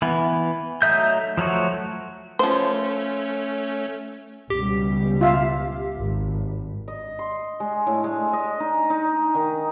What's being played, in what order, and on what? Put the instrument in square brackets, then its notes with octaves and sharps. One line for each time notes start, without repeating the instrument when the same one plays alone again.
[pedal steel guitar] E3 B3
F#3 A3 D#4 E5 G6
F3 F#3 A3 F#4
[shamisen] F3 C5 [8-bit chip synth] A3 C#4
[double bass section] C#2 B2 G3 [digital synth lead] G4
[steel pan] F4 E5 F5
[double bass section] G#1
[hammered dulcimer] D#5
C6
G#3
A2
G#3
D#5
D#4
D#4
D#3